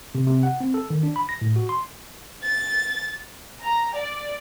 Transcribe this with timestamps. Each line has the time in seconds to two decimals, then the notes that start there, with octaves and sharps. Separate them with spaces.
0.15 C3
0.27 C3
0.43 F#5
0.60 C4
0.74 A4
0.90 D#3
1.03 D4
1.16 B5
1.29 A#6
1.41 A2
1.56 F#4
1.69 C6
2.43 A6
3.64 A#5
3.96 D5